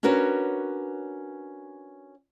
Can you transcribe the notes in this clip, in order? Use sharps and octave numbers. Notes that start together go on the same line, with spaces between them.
C#4 D4 F#4 A#4 B4 C#5